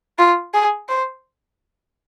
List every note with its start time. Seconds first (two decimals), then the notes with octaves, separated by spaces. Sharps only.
0.18 F4
0.54 G#4
0.89 C5